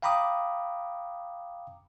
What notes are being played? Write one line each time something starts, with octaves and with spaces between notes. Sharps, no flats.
F5 G5 A#5 B5 D6 D#6